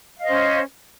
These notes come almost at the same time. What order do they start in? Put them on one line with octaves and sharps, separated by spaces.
F5 D#5 C5 C#4